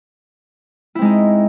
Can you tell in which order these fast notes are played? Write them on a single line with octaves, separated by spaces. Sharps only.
E4 C4 G#3 D#4